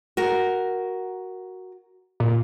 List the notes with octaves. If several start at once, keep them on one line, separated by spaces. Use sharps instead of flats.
F#4 A#4
A#2